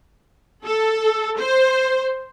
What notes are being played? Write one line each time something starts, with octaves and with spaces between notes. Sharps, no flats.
A4
C5